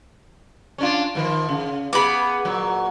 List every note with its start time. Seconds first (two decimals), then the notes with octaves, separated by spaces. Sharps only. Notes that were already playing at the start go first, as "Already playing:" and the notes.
0.78 C#4 D4 F4
1.15 G#2 D#3 F3
1.49 C#3
1.93 B3 G4 G#4 B5 D6
2.45 A#2 F#3